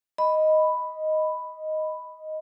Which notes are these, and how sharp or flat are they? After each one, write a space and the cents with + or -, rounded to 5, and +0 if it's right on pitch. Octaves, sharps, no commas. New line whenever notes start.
D#5 +0 B5 +0